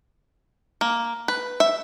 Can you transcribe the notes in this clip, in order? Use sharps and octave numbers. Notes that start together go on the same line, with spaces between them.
A#3
B4
E5